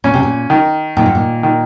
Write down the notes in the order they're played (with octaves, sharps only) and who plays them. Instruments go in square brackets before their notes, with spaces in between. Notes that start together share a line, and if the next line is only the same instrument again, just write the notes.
[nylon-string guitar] A#2 [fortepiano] C#4
[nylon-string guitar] C3
A#2
[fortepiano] D#3
[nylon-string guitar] A#2 [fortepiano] D#3
[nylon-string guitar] G#2
A#2
[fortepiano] D#3